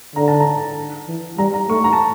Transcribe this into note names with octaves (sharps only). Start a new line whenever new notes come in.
D3 A#5
A5
A#5
E3
G3 A#5
A#5
A3 C#6
A#5
A5